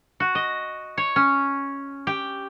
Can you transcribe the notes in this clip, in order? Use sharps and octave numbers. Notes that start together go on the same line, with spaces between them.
F#4
D#5
C#5
C#4
G4